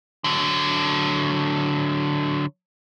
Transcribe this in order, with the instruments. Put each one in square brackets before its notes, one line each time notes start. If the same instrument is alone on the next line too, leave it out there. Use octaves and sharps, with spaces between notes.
[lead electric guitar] D3 F#3